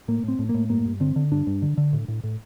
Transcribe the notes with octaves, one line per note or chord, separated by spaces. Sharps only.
A2 A#3
A2 C4
A2
A#3
A2
G2 A#3
G2
D3 C4
D3
G2 D4
G2
D3
D3
A2
A2
A2